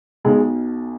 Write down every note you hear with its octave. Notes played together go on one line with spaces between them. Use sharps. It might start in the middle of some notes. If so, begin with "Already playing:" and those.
B1 B2 G#3